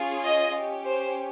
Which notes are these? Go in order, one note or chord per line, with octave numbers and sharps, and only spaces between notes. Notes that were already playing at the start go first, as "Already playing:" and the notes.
Already playing: C#4 F4 G#4
D#5
C#4 G4
C5